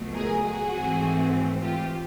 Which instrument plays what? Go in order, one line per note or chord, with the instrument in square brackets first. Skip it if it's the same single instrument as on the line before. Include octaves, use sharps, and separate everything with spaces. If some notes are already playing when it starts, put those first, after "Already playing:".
Already playing: [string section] C#2 B2 F#3 A3
G#4 A#4
F#4 G#4
G#1 G#2 E3 A3 C4
F4 G4